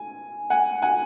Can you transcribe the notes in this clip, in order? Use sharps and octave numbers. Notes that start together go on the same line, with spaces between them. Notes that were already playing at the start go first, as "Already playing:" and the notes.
Already playing: G#5
F#5 G#5
F#5 G#5